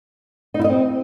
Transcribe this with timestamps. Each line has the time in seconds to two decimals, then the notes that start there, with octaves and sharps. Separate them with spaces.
0.54 D#4
0.59 E4
0.64 D#5
0.69 C4